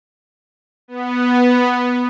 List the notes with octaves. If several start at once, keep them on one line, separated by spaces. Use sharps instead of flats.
B3